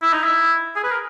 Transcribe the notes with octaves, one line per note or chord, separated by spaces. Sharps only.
E4
D#4
E4
G#4
B4
A#4